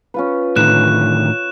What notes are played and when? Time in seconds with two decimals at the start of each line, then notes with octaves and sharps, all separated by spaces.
0.14 C#4 F4 B4
0.56 A2 D3 D#3 F#6 E7